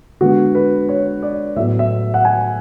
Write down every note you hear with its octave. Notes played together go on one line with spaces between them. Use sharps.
D3 G#3 B3 F#4
B4
C#5
D5
A2 F#3 B3 E5
E5
F#5
G#5